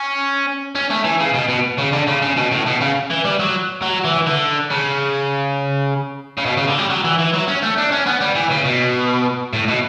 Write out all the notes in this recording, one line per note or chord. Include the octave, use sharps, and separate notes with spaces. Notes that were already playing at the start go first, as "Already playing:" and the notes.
Already playing: C#4
C#4
A3
E3
C#3
B2
B2
C#3
D3
C#3
C#3
B2
A2
B2
C#3
E3
G3
F#3
F#3
E3
D3
C#3
C#3
B2
C#3
D3
G3
F#3
E3
E3
F#3
C#4
A3
D4
C#4
B3
G3
E3
C#3
B2
A2
B2